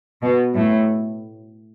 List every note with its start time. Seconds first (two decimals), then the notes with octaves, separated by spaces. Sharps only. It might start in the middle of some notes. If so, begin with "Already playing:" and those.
0.22 B2
0.55 A2